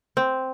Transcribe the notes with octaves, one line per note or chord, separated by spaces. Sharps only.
C4